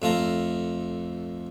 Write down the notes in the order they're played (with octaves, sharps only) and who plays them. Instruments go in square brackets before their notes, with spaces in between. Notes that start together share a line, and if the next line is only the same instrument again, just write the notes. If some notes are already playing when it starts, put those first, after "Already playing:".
[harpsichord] F2 A3 F4 A#5